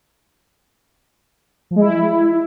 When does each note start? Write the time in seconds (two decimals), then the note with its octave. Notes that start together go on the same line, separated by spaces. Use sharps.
1.71 F3
1.76 G#3
1.81 E4